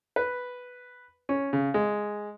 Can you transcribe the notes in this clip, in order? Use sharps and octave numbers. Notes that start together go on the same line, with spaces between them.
B4
C#4
C#3
G#3